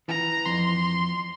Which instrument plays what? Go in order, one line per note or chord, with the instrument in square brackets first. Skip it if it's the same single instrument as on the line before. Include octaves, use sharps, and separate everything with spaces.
[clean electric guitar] E3 [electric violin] A#5
[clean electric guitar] F2 [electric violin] C6